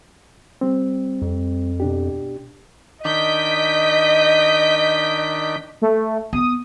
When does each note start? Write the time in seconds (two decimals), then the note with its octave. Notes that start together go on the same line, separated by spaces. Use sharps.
0.61 G3 C4
1.22 F2
1.80 B2 D4 G4
3.05 D#3 D4 D#5 G6 B6 D7
5.82 A3
6.33 B3 D#6